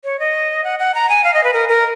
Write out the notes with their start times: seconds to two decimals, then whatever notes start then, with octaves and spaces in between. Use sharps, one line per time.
0.04 C#5
0.20 D#5
0.64 F#5
0.79 F#5
0.95 A#5
1.09 G#5
1.24 F5
1.34 D#5
1.44 B4
1.53 A#4
1.69 A#4